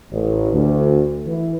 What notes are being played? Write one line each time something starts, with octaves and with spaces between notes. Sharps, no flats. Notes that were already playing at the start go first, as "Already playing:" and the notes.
A1
D2
E3